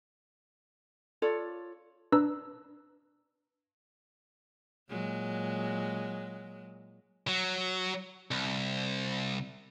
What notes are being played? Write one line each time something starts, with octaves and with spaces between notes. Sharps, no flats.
F4 A4 C#5 D5
D4 B4 A#5 E6
A#2 F#3 G#3
F#3
C2